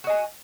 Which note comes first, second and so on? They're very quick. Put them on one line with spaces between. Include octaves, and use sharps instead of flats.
F#4 D#5 G#5